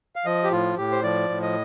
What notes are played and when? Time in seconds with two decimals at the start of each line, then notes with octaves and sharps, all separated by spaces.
0.16 F5
0.26 F3 D#5
0.44 G4
0.51 A2 F4
0.77 A2 G4
0.92 C5
1.03 F3 D5
1.30 A2
1.42 D#5